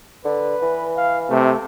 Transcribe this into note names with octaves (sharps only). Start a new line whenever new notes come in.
D3 B4
E3
F5
C3 A3